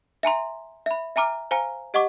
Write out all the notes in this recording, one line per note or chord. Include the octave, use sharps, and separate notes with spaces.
E5 G#5 A#5 C6
E5 B5
E5 G#5 A#5 D6 F6
C5 F5 G#5 A#5
G4 D#5 F#5 C#6 D6